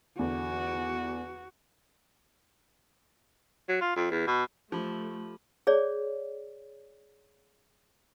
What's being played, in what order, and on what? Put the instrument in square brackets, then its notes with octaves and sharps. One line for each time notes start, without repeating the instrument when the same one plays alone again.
[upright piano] E2 D3 [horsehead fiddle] F#4
[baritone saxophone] F#3
F4
F2
E2
B2
[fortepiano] F3 [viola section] A3 [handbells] G4 B5
[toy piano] G#4 C#5 D5